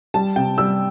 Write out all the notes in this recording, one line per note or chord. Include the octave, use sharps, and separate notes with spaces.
G3 A5
C3 G5
G3 E6